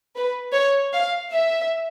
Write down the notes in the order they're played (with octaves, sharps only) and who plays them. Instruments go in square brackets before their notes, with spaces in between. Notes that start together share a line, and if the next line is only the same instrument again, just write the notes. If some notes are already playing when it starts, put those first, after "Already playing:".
[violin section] B4
C#5
F5
E5